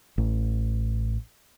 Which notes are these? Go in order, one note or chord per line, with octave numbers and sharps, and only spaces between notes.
A1